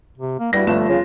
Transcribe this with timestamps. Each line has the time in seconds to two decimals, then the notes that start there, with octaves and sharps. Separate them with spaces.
0.18 C3
0.40 A#3
0.53 G2 G3 E4 F#4 A#6
0.67 G1 F3 A3 E7
0.89 C#3 F4